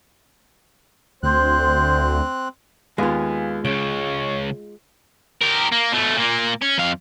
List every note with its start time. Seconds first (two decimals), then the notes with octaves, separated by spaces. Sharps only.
1.23 D2 C4 C5 F#6
2.98 D#2 G#3 B3 F4 G#5
3.65 C#2 C#3 C#5 D7
5.41 G4 A#4
5.72 A#3
5.92 B2 A3
6.16 A#2 A#3
6.62 C#4
6.78 F2 F5